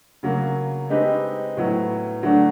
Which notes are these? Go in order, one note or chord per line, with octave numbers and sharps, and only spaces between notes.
C#3 F#3 A#3
G#3 C4 D#4 G4 B4
A2 F#3 B3 E4
D3 F#3 A3 D4 F#4